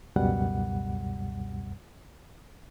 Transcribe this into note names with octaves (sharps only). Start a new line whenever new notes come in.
C#2 F#2 B2 G3 F#5